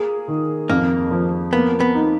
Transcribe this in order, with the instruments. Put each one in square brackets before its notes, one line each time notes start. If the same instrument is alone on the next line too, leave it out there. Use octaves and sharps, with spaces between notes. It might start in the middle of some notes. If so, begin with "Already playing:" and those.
Already playing: [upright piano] A#3 G#4
D#3
[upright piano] F2 [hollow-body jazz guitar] A#3
[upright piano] F3
[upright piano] A#3 [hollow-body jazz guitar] B3
[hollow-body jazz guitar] B3
[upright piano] D#4